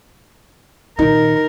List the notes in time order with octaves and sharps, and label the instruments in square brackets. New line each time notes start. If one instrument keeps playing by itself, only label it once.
[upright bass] A#2 D#3 [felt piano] D#4 [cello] A#4